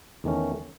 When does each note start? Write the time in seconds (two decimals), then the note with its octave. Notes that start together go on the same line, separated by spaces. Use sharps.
0.24 E2 D#3 A3 C#4